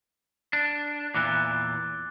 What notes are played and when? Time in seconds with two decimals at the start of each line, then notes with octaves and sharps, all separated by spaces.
0.53 D4
1.14 E2 A#2 E3 D6 F#6 A6